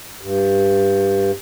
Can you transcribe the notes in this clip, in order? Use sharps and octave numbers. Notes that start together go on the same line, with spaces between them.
G2